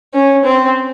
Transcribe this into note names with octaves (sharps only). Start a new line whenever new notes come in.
C#4
C4